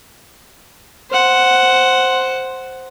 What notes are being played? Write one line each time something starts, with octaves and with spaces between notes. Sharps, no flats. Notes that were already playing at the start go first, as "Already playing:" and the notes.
C5 F#5